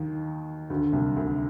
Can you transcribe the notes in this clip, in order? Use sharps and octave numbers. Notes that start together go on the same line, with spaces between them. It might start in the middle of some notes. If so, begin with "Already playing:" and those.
Already playing: D#2 D#3
D2 D3
C2 C3
D2 D3